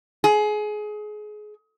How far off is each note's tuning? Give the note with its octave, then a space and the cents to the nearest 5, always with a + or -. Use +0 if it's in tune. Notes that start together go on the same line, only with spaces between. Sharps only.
G#4 +25